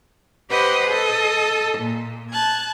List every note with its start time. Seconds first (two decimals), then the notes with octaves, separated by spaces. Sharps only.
0.50 G4 B4 C5 D#5 F#5
0.87 A4 D#5
1.77 A#2
2.31 A5 F#6 G#6